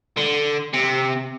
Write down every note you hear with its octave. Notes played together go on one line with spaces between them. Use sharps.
D3
C3